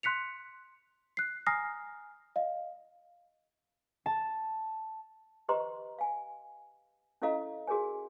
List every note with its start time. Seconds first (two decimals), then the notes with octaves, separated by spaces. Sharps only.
0.03 C6 F#6 B6 C#7 F7
1.17 F#6 C7
1.47 G#5 A#5 D#6 F6 A#6 C7
2.36 D#5 F5
4.06 A5
5.49 G4 B4 C5 D#5 A#5 C6
5.99 F5 G#5
7.22 C#4 E4 A4 D#5 F5 A#5
7.67 F#4 G#4 A#4 C#5 G#5